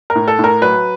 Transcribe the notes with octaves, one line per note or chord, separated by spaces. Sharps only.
A#4
A2
A4
A2
A#4
F#3 B4